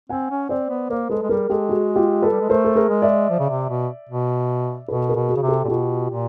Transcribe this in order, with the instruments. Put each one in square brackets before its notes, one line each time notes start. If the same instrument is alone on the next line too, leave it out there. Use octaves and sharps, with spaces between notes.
[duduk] C4 [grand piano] F#5 G#5
[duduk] C#4
[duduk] C4 [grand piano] C5 D5
[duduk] B3
[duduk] A#3 [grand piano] A#4 C5
[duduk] G#3 [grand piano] A4 B4
[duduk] G#3
[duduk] G3 [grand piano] G#4 A#4
[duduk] G#3 [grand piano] G4 A4
[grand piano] F#4 G#4
F4 G4
A4 B4
[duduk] G3
G#3
[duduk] A3 [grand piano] A#4 C5
[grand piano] A4
G#4 A#4
[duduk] G#3
[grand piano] D5 E5
[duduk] F3
C#3
C3
B2
B2
[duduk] B2 [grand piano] A4 B4
[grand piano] G#4 A#4
[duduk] B2
[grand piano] F#4 G#4
[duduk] C#3
C3
[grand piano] G4 A4
[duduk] A#2
[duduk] B2 [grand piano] F4 G4
[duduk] A#2